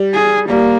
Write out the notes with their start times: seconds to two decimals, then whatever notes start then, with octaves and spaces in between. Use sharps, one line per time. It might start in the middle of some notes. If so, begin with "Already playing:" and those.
Already playing: G3
0.14 G#4
0.49 G3 A#3